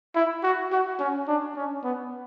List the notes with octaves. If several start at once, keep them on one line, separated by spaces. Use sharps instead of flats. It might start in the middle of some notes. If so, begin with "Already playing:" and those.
E4
F#4
F#4
C#4
D4
C#4
B3